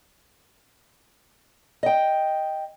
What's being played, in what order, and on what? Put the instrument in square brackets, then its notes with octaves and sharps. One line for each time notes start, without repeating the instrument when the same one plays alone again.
[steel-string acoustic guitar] D#5 G5